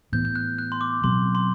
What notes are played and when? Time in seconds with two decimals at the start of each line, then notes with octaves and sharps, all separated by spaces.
0.12 A2 E3 B3 G6
0.25 G6
0.36 F#6
0.59 F#6
0.72 C6
0.81 D6
1.04 B2 F#3 C4 C6
1.35 C6